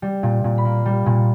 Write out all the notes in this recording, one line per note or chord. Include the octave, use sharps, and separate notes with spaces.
G3
A#2
A#2
B5
A#3
G3
A#2